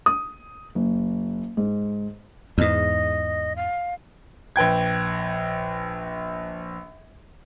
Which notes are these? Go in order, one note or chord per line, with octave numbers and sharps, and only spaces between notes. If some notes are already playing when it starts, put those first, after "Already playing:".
D#6
F#1
G#2
E2 G#2 D#5
F5
A#1 B4 G5 G#6